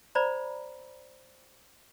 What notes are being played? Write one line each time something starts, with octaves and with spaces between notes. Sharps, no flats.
C5 D5 A#5 B5